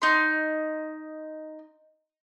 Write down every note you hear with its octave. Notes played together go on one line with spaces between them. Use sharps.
D#4 C6